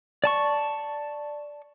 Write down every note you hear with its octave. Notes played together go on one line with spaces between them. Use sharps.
D5 A5 C#6